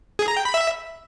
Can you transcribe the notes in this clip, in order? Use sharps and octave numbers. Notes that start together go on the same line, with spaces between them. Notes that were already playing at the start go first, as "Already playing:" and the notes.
G#4
A#5
G5
B5
E5